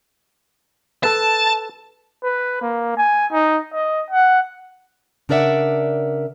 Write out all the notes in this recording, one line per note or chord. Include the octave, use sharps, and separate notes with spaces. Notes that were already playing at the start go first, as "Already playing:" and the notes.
A4 B4 A5
B4
A#3
G#5
D#4
D#5
F#5
C#3 D4 A#4 D5 E5 F#5